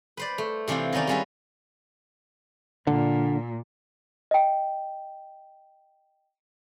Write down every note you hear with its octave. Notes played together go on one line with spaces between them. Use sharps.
B4 C5 D5
A3
C3 E3 D4 F4 C5
D#3 B3 C#4 D#4 D5
G3 G#3 C#4 F4 B4 E5
A#2 D3
D#5 G5